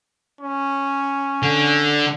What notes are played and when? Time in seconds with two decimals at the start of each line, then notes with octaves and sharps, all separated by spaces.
0.41 C#4
1.43 D3